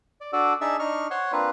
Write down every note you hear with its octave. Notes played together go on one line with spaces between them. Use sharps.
D5
D4 F#4 A4 D5
D4 D#4 G#4 E5 A5 E6
D4 D#4 C#6 F6
C5 C#5 F#5 C6 C#6
A#3 C4 D4 F4 B4